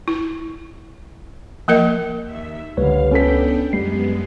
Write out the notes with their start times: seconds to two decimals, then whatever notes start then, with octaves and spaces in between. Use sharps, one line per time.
0.08 E4
1.68 F3 A#3 A#4 D#5
2.24 D#2 E5
2.77 C#2 D3 G3 B4 C#5 F5
3.11 B3 C#4 D4 A4 G5 B6
3.73 F#2 G3 G#3 B3 C7